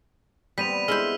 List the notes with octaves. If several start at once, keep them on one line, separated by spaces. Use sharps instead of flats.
G3 B3 C4 B6 D#7 F7
G#3 E4 C5 E6 F6